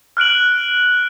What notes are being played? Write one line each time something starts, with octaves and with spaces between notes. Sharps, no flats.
F6 F#6 D7 F#7